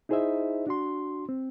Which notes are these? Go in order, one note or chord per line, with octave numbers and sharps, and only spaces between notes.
D#4 E4 G#4 C5 D#5 E5
D4 F#4 C6
C4